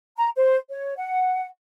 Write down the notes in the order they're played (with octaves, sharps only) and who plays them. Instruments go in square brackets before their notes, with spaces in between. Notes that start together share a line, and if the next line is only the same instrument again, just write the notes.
[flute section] A#5
C5
C#5
F#5